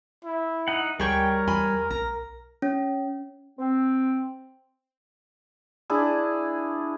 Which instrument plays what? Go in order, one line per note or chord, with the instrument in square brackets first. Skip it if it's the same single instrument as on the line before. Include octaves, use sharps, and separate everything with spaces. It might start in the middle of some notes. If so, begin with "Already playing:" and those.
[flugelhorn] E4
[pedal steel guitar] D#4 F#5
[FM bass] D2 [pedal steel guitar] G3 C#5 [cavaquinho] G#4 G5 C#6 [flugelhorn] A#4
[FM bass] E2 [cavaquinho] G#5 B5 C6
[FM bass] B1 [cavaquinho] A#5
[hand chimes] C#4
[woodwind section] C4
[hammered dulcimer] D4 E4 G#4